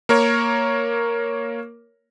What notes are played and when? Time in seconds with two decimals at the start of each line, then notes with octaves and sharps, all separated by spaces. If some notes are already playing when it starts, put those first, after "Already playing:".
0.09 A#3 A#4 C#5